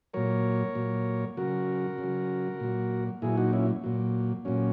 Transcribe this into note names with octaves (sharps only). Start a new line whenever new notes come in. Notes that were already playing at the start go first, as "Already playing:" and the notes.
A#2 F#3 A#4 C#5
A#2 F#3
C#3 F#3 F#4 A#4
C#3
F#3
A#2 F#3
A#2 F#3 E4 G#4
D#4 F#4
C#4 E4
A#2 F#3
A#2 F#3 C#4